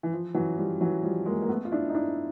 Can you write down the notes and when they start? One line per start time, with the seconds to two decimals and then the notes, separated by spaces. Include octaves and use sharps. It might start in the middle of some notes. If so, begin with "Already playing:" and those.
0.03 E3
0.13 F3
0.34 E3 F#3
0.58 F3 G3
0.81 E3 F#3
1.03 F3 G3
1.26 G#3 A#3
1.42 A#3
1.49 A3 B3
1.65 F4
1.72 D4 E4
1.89 D#4
1.95 D4 E4